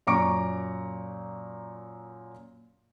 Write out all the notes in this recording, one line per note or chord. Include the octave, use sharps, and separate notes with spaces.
F#2 A#2 A#5 C#6 D6 D7